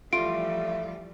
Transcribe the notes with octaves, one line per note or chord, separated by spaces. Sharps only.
E3 F3 G3 A3 F4 D7